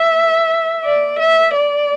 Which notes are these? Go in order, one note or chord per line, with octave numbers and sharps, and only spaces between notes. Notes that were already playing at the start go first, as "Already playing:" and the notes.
Already playing: E5
D5
E5
D5